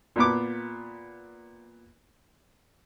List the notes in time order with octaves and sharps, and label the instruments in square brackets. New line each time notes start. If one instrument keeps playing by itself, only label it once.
[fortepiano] A#2 B3 D6